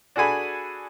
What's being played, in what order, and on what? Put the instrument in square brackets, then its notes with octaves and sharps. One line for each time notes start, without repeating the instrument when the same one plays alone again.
[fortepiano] D4 F#4 G#4 A4 G#5 B5